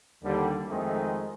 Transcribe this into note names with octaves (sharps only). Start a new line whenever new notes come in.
D#2 D3 G3
F2 D#3 G#3 A3 C4 D#4